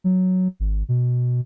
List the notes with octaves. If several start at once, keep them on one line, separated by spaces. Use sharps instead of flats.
F#3
G#1
B2